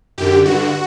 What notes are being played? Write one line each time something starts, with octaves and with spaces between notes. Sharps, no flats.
F#2 D3 G4
G2 F#4
D3